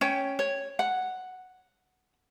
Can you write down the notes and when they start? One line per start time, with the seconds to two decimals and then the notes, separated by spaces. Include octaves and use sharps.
0.01 C#4 C#5 G5
0.39 C#5
0.79 F#5